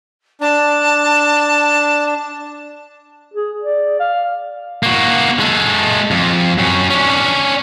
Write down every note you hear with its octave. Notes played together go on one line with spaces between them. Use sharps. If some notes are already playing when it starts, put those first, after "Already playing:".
D4 A5
G#4
D5
F5
A#3 F#4
G#3 A4
F2
F#2 C#4
C#4 D4